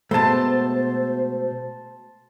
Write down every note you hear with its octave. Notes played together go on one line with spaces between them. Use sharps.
B2 G#3 A3 C5 A5 C6